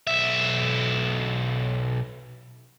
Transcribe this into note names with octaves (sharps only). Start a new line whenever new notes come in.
B1 E5